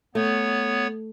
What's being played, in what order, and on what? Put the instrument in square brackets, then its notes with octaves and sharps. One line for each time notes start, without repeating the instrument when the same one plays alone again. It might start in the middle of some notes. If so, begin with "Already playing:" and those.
[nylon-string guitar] A3 [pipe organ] B3 C#5